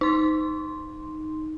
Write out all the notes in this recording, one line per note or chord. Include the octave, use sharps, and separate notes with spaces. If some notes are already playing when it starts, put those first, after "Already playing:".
D#4 C6